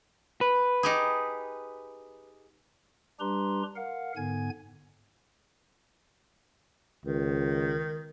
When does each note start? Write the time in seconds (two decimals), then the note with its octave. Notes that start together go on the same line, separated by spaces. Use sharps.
0.41 B4
0.83 D#4 G4 G#4
3.20 G3 D4 G4 B4 A#5 C6
3.76 A#4 F5 F#5
4.16 G#2 D3 B3 G#5 G#6
7.06 C#2 D#3